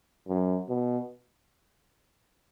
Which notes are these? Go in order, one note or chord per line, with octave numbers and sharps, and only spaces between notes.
F#2
B2